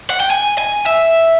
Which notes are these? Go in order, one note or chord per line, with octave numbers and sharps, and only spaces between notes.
F#5
G5
G#5
G#5
E5